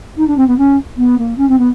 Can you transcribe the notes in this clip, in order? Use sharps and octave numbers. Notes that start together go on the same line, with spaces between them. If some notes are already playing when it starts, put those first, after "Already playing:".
D#4
D4
C4
B3
C#4
B3
A#3
C#4
C4
B3